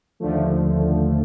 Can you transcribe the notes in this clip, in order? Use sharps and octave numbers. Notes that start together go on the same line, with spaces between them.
D#2 D3 F3 A3